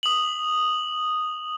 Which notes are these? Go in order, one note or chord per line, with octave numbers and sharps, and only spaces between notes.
D#6 F7 F#7